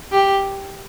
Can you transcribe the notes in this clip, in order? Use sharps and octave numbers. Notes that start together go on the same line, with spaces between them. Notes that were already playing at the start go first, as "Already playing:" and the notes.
G4